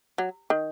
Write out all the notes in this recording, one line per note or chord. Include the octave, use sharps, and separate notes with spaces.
F#3
D#3